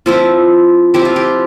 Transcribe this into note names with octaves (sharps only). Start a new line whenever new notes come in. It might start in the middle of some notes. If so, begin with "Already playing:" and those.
F3 C4 E4 F4
F3 C4 E4 G4
F4
G4